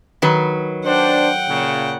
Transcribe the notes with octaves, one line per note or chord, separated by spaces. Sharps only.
D#3 F#3 B4
D4 C5 F#5 G5
A#2 C#3